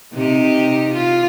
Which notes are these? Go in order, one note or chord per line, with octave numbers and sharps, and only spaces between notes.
C3 D#4 G4
F4